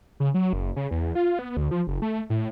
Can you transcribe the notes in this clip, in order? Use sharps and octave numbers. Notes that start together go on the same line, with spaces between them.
C#3
F#3
F#1
C#3
E2
F4
B3
D2
F3
F#1
A3
A2